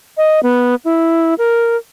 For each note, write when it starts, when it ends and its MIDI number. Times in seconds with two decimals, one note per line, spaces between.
0.17 0.40 75
0.43 0.75 59
0.85 1.34 64
1.38 1.77 70